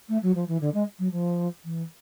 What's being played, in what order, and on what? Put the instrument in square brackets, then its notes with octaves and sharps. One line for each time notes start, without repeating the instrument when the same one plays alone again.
[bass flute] A3
F#3
F3
E3
D3
G#3
F#3
F3
E3